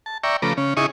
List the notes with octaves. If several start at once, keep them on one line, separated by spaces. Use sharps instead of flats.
A5
D5 E5 G5 A#5 C#6
C#3 F3 A3 B4 A#5 D6
C#3 C#4
C#3 D#4 E4 G#4 C#6 D#6